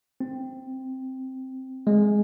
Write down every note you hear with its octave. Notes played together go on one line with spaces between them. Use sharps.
C4
G#3